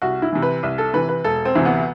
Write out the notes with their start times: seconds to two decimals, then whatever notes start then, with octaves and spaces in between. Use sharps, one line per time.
0.02 C2 F#4
0.22 E4
0.33 C3 E3
0.42 B4
0.63 C2
0.78 A4
0.93 C3 E3 B4
1.09 B4
1.24 E1 A4
1.45 C4
1.55 D2 C3 E3
1.65 B3